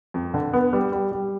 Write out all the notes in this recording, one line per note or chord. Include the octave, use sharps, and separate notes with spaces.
F2
D3
B3
G3
G3
G3